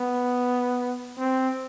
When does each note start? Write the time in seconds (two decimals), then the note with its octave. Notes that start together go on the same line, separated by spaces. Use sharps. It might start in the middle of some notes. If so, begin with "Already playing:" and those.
Already playing: B3
1.19 C4